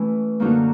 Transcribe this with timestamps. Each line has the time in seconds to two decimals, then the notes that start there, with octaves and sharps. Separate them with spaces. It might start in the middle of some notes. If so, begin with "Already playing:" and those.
Already playing: E3 A3 C#4 E4
0.40 F#2 D3 F#3 A#3 D#4